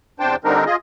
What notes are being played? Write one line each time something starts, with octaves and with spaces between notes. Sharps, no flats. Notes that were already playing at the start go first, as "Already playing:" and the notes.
E2 C3 D4 C5 G5 A5
D3 G3 C4 D4 D#4 A#4
F4 G#4 D#5